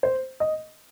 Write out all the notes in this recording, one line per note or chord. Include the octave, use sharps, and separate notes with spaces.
C5
D#5